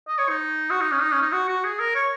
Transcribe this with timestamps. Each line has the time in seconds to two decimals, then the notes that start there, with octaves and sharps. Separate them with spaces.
0.08 D#5
0.19 C#5
0.29 D#4
0.70 F#4
0.81 D#4
0.92 C#4
1.01 D#4
1.12 C#4
1.22 D#4
1.33 F#4
1.49 F#4
1.64 G#4
1.80 A#4
1.95 C#5